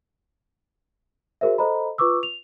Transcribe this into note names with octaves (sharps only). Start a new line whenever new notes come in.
F#4 G#4 A#4 C5 E5
A4 C5 D#5 A#5 B5
F4 B4 C#6 D6 E6
F7